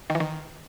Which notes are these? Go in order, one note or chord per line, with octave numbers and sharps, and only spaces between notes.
D#3
E3
D#3